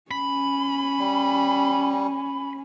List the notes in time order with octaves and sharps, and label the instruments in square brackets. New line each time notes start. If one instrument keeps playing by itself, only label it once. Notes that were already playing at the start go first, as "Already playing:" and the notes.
[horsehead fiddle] C#4 [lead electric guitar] B5
[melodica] G3